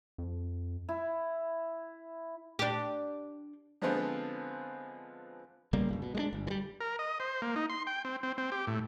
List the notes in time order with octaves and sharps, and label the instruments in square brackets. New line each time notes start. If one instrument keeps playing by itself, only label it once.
[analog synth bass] F2
[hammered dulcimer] E4
[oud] D4 G4
[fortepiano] D3 F3 G#3 B3 C4 F4
[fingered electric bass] B1 C#3 G3 A#3
G1 C#2
B2
G#3 A3 D4
G1
E3 G3
[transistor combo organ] A#4
D#5
C5
A#3
D#4
C6
G5
C4
C4
C4
G4
A2